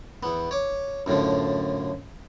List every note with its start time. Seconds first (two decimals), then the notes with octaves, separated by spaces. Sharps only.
0.23 E2 B3
0.51 C#5 D6
1.06 F#2 A2 D3 F3